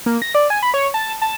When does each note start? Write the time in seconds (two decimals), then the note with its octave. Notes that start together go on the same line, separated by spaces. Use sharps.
0.06 A#3
0.22 A#6
0.35 D5
0.50 G#5
0.63 B5
0.74 C#5
0.94 A5
1.22 A5